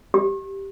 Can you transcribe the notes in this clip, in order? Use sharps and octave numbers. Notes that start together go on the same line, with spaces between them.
G4